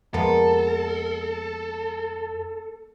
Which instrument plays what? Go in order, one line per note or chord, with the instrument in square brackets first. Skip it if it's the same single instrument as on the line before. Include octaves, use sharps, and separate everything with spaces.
[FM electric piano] F2 A5 [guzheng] G#3 A#3 B3 [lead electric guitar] A4